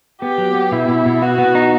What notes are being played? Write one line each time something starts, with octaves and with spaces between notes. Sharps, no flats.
B3 G4
F#3
B3
B2 E4
B2
B2
B3 F#4
B3
D#4